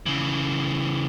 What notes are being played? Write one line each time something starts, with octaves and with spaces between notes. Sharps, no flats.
C#3 E3